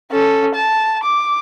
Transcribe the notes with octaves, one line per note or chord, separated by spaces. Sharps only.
C#4 A4
A5
D6